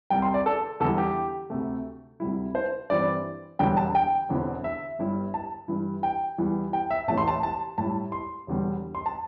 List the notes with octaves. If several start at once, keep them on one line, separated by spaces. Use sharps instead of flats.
C2 C3 G3 G5
C6
D5
A4
E2 D3 G3 E4 A4
G4
D2 C3 A3
D2 C3 G3 E4
C5
G2 E3 C4 D5
E1 E2 D3 G3 G5
A5
G5
E1 E2 D3 C4 E4
E5
G1 G2 G3 E4
A5
G2 E3 G3 E4
G5
E2 E3 G3 E4
G5
E5
A1 A2 E3 A3 A5
C6
A5
A5
A2 G3 E4 A5
C6
E1 E2 D3 G3
C6
A5